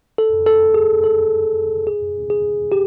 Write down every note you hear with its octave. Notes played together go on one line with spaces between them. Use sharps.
A4
A4
G#4
A4
G#4
G#4
G4